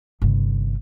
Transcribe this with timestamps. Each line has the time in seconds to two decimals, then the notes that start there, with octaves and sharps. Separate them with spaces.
0.22 G1 C3